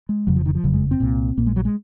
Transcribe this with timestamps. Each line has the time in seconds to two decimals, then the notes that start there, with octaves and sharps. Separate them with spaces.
0.09 G#3
0.27 F1 F2 C#3 F#3
0.36 F3
0.46 D#3
0.55 F3
0.64 F#1 F2 C#3 F#3
0.73 G#3
0.91 C4
1.00 C2 A#2
1.37 A#1 A#2 A#3
1.47 G#3
1.56 F#3
1.65 G#3